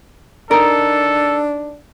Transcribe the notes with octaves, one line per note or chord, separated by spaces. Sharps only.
D4 D#4 A4 A#4